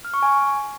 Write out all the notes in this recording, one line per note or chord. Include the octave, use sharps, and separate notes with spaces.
F6
C#6
G#5